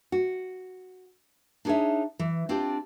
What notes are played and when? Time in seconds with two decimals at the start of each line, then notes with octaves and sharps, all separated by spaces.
0.12 F#4
1.65 D4 D#4 G#4 C5 C#5 E5
2.19 E3
2.49 C4 D4 F4 G4